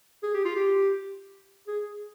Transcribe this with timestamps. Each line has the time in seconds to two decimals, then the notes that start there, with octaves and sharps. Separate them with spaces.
0.23 G#4
0.34 G4
0.45 F4
0.56 G4
1.68 G#4